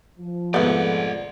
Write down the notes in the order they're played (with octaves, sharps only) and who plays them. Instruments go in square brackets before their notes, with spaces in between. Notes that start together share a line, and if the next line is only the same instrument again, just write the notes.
[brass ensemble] F3
[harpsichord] F2 G#2 [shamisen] A3 B3 [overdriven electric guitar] C5 D5